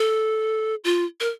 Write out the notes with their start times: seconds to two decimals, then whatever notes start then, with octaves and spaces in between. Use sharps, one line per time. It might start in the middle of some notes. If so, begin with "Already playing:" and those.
Already playing: A4
0.84 F4
1.20 A#4